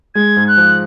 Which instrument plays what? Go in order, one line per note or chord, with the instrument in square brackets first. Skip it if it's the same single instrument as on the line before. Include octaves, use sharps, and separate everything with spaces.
[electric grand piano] G#3 [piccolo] G#6
[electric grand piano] G#2
[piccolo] F#6
[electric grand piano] F3